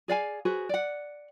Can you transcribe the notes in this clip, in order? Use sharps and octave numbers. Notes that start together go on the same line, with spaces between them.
G#4 D5 F5 G#5
F#4 G#4 B4 C5
D5 F#5